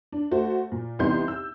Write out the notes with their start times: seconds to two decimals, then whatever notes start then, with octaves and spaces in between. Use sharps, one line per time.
0.12 D4
0.31 A3 F#4 C5
0.72 A#2
0.99 C2 E3 B3 D#4 C6 G6
1.28 E6